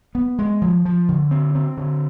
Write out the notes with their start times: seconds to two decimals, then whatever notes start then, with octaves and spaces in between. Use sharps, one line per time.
0.15 B3
0.39 G#3
0.61 F3
0.85 F3
1.09 D3
1.31 C4
1.55 C4
1.77 D3